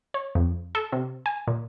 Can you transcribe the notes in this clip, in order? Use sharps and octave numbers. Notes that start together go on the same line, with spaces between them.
C#5
F2
A4
C3
G#5
A#2